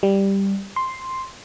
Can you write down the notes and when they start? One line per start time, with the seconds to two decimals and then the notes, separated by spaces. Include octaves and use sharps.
0.03 G3
0.76 C6